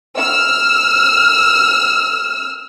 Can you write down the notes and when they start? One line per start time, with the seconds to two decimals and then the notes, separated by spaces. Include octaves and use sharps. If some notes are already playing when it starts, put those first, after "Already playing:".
0.17 E6 F6